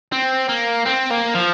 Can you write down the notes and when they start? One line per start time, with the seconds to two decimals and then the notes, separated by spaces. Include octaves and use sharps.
0.12 C4
0.49 A#3
0.86 C4
1.11 A#3
1.35 F3